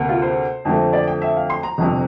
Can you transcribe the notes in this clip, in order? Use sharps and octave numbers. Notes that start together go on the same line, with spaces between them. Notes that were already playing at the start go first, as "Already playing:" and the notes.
Already playing: D2 C3 A#3
F4
C5
F2 D3 A3 C4
D5
G5
E5
F5
C6
A#5
G1 F2 C3